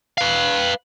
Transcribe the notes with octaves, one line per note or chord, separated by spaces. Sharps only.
B4 F5